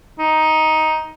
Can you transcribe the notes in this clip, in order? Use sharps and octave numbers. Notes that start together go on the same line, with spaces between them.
D#4